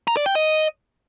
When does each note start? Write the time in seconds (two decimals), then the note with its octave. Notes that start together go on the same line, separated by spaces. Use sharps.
0.08 A#5
0.17 D5
0.26 G5
0.35 D#5